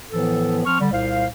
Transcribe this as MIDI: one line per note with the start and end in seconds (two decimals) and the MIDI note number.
0.11 0.63 45
0.11 0.63 52
0.11 0.63 53
0.11 0.63 59
0.11 0.63 69
0.65 0.80 53
0.65 0.80 60
0.65 0.80 85
0.65 0.80 89
0.80 0.87 50
0.80 0.87 55
0.92 1.26 36
0.92 1.26 46
0.92 1.26 72
0.92 1.26 77